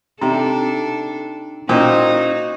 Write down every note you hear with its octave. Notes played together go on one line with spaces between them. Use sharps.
C3 D4 D#4 A4 G5 A#5
A#2 C#4 D#4 E4 F#4 C5 G5